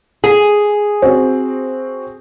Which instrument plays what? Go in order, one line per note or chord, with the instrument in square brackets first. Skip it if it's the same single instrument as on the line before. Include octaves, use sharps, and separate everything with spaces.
[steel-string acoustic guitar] G#4
[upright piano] C4 F#4